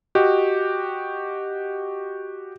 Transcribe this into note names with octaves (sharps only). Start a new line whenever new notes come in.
F#4 G4 D#5